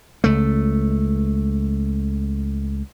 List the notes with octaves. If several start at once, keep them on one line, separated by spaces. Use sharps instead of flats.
C#2 A3